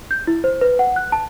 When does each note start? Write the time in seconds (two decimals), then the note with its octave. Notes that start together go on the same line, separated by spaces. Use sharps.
0.11 G6
0.27 E4
0.44 C5
0.61 B4
0.79 F#5
0.96 F#6
1.12 A5